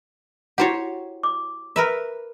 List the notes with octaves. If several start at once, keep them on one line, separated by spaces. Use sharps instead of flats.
E4 F#4 G4 C5 C#5 F#5
D6
A#4 B4 E5